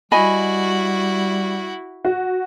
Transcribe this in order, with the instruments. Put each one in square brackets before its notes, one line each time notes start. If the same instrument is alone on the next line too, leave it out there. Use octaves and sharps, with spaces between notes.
[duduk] G3 [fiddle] E4 F#4 [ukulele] D#5 G#5 B5
[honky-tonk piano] F#4